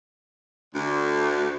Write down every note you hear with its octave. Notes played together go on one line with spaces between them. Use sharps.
D2